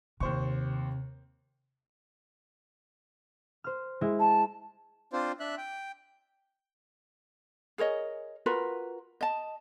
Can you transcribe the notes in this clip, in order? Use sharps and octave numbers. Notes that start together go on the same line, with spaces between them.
D#2 C3 C5 C#6
C5 F6
G#3 E4
A5
C4 D4 F4 C5
D4 E5 F#6
G5
G#4 A#4 C#5 D#5
F4 F#4 A#4 B4
D#5 A5